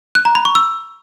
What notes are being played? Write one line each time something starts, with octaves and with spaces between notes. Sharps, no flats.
F#6
A#5
B5
C#6
E6